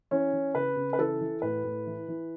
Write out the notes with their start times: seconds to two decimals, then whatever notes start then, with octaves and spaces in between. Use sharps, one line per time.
0.11 E3 C#4
0.33 E3
0.55 C#3 B4
0.76 C#3
0.93 B4
0.98 E3 A4
1.21 E3
1.42 A2 B4
1.64 A2
1.87 E3
2.08 E3